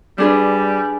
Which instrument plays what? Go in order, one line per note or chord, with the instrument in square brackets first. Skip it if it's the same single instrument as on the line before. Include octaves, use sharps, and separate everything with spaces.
[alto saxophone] G3 [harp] D4 G#4 B4